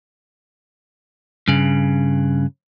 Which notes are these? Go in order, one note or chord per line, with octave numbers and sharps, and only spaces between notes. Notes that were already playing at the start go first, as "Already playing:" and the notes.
G2 C#3